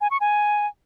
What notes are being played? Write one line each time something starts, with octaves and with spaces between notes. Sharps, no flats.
G#5
C#6
G#5